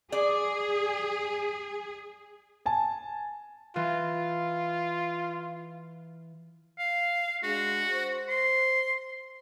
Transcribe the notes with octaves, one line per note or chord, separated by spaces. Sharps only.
G#4 D5
G#5 A5
E3 F4
F5
G#3 D4 F#4
C5
C6